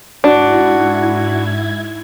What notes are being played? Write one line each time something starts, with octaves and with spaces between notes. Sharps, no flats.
G#2 D4 E4 F#4 G#6